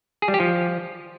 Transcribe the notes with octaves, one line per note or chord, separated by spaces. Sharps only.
G#4
G3
G4
F3